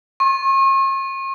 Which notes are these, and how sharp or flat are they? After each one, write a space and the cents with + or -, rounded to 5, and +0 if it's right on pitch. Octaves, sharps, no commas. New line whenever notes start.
C#6 -45